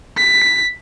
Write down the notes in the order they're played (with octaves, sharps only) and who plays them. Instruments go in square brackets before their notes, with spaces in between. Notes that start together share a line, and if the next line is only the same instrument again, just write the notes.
[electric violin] B6